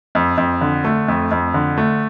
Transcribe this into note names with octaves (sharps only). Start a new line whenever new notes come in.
F2
F2
D3
A3
F2
F2
D3
A3